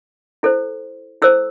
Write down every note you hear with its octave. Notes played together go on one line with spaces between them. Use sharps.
E4 A4 C5
E4 A4 C5 E6